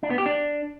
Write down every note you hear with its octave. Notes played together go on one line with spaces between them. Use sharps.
D4
B3
G4
D4